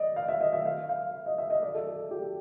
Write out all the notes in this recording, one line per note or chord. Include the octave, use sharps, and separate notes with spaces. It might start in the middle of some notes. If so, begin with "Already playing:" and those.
Already playing: D5 D#5
F5
E5
D#5
E5
F5
F5
D#5
E5
D#5
D5
A4
A4
G4